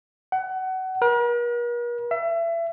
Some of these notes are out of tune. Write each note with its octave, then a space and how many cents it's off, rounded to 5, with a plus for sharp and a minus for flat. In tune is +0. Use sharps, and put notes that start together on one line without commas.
F#5 +25
A#4 +45
E5 +30